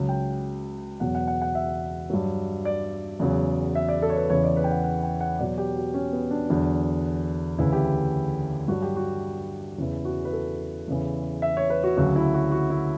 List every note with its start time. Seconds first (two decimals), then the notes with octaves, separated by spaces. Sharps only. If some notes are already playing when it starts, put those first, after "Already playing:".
Already playing: C#2 C#3 F#3
0.09 G5
1.00 E2 B2 F#3 F#5
1.15 F#5
1.27 F#5
1.42 F#5
1.55 E5
2.10 G2 F#3
2.65 D5
3.19 E2 C#3 F#3
3.75 E5
3.89 D5
4.02 A4
4.10 C#5
4.16 B4
4.30 E2 C#3 E3 C#5
4.44 D5
4.57 B4
4.64 G5
4.71 F#5
4.84 F#5
5.03 G5
5.20 F#5
5.39 E2 B2 F#3 D5
5.58 G4
5.76 F#4
5.94 C#4
6.12 B3
6.31 D4
6.49 E2 D3 F#3
7.58 D2 C#3 E3 E4
7.73 G4
8.68 G2 F#3 F#4
8.83 G4
8.96 F#4
9.78 E2 C#3 E3 E4
10.05 F#4
10.25 B4
10.33 A4
10.88 E2 C#3 E3
11.42 E5
11.57 C#5
11.70 B4
11.84 F#4
11.97 D2 C#3 F#3 F#4
12.16 E4
12.34 F#4
12.52 F#4
12.70 E4